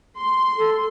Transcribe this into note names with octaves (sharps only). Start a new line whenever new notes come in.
C6
A4